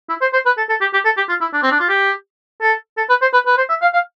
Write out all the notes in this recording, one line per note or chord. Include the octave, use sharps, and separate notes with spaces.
E4
C5
C5
B4
A4
A4
G4
G4
A4
G4
F4
E4
D4
C4
D4
F4
G4
A4
A4
B4
C5
B4
B4
C5
E5
F5
F5